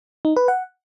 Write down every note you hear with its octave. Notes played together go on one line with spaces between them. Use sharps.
D#4
B4
F#5